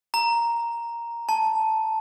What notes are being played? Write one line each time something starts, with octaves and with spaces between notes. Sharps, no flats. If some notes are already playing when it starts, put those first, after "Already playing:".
A#5
A5